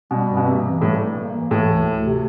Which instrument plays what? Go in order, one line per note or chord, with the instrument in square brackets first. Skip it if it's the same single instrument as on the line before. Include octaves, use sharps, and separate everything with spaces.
[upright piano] B2 [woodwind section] G3
[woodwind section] G2
[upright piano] B2
[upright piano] C3 [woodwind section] A#3
[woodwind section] E3
[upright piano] A2 [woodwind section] G3
[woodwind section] G2
A#3
E3
[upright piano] A2 [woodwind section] E3
[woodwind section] D2
D2
C3